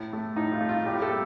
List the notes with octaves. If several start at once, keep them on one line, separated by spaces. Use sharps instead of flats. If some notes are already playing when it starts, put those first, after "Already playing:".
Already playing: A2
A3
A2 D#4
F4
A3
F4
A2 G4
A4
G3 A#3